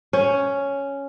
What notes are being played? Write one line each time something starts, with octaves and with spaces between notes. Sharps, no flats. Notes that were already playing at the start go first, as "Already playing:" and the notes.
C#4